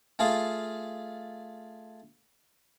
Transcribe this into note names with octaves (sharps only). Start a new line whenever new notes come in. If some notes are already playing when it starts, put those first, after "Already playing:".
A3 F4 G#4 A4 F5